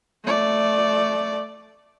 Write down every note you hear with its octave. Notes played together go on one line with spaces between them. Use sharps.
A3 D5